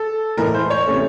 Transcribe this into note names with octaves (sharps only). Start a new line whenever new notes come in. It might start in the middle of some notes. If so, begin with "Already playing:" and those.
Already playing: A4
A2 E3 G#3 A#4
C5
C#5
C3 E3 A3 C#4